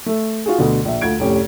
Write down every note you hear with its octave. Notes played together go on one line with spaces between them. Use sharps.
A3 A4
F4 F#4 G#4
D2 B2 D3
A#1 E5
D2 F4 G#6 D7
F1 A2 C#4 G4